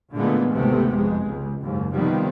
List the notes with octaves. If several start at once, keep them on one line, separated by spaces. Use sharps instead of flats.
A#2 D3 E3 G#3 A3 B3
G#1 D2 C3 A3 B3
F2 G#3
C#2
F#1 D#2 G#2
C3 D#3 F3 G3 B3 C4